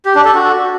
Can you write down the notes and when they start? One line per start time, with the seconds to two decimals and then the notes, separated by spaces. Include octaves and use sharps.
0.05 G4
0.15 D4
0.25 A4
0.35 F#4